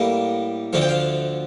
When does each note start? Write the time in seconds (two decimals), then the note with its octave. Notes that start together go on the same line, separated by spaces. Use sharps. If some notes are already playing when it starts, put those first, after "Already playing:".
Already playing: A2 G3 A#3
0.73 D2 D3 F3 A3 F5
0.82 G5
0.89 F5